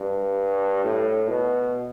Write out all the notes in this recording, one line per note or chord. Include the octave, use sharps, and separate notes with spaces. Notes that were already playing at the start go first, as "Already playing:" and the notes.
Already playing: G2
A2
B2